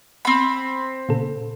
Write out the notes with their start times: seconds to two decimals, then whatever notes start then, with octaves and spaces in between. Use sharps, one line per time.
0.25 C4 B5
1.09 A#2 C#3 A4